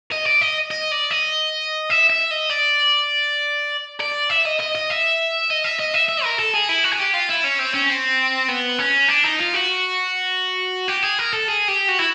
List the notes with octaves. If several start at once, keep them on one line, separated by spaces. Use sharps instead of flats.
D#5
D5
D#5
D#5
D5
D#5
E5
E5
D#5
D5
D5
E5
D#5
D#5
D#5
E5
D#5
E5
D#5
E5
E5
A#4
A4
G#4
E4
F#4
G#4
G4
F4
E4
C#4
C4
C#4
C4
B3
C#4
D4
D#4
F4
F#4
G4
G#4
A#4
A4
G#4
G4
F#4
E4